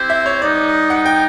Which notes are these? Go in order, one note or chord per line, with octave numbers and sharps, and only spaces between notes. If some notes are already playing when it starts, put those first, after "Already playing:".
Already playing: C4 E4 G4 C5
E5
C#5
G3 B3 D#4 D5
F#5
G5